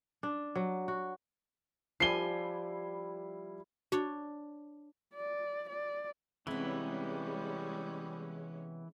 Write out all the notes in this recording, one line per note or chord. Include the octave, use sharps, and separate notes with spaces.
D4
F#3
F#4
F3 G3 E4 G#5 D6 C7 G7
D4 F#4 C#5
D5
D5
C3 E3 G3 G#3 B3 C#4 E4